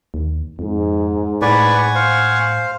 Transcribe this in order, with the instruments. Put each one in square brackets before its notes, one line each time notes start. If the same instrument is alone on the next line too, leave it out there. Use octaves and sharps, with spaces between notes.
[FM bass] D#2
[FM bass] F2 [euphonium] G#2
[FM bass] A2 [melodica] B4 D5 [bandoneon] F#5 G#5 C#6
[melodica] C5 F5